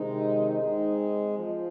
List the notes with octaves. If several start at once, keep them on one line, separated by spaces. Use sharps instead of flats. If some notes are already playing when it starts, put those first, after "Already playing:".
Already playing: C3 D#3 G#3 C4 D#4
G#3 C4 D#4
F3